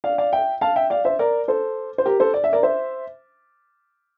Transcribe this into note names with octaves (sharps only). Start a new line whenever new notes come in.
D5 F5
D5 F5
E5 G5
F5 A5
E5 G5
D5 F5
C5 E5
A#4 D5
A4 C5
C5
G4 A#4
A4 C5
D5
E5
A#4 D5
C5 E5